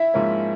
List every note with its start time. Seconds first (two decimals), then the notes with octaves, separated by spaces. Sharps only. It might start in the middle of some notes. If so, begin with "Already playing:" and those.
Already playing: E4 E5
0.14 G#2 F3 A#3 C#4